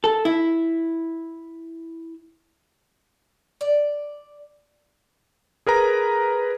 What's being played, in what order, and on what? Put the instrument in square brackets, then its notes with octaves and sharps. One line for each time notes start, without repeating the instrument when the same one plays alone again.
[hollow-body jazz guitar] A4
E4
[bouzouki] D5
[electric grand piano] G#4 A#4 B4 A#5